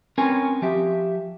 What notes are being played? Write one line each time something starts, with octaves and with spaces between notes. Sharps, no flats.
C4 C#4 A#4 B4 G#5
F3 G4 E5